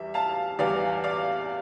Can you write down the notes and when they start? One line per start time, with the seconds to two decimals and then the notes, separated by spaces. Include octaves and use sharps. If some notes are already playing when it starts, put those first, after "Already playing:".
Already playing: E2 E3 G3 E5
0.14 F5 A5
0.59 E2 E3 G3 D5 F5
1.04 D5 F5